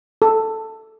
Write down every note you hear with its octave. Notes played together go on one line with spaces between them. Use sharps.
A4